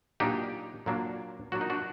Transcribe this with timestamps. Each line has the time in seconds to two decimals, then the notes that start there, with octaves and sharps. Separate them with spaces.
0.20 A#2 F#3 A#3 D4 D#4 G4
0.86 A#2 F#3 A#3 D4
1.52 A#2 F#3 A#3 D4 F#4
1.61 D#4
1.70 D4 F#4